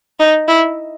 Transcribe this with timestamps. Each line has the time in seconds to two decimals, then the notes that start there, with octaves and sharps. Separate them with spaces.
0.20 D#4
0.48 E4